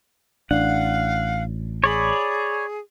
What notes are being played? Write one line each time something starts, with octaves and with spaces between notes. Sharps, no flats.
A1 D4 F5 F#5
G#4 C#5 D5 B5